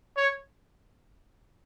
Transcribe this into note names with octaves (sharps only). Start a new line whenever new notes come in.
C#5